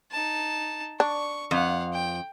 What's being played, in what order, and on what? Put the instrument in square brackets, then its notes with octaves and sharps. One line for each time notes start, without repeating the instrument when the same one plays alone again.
[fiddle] D#4 A5
[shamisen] D4 [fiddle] C#6
[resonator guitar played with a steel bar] F2 [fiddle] F5 F#5
[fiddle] G5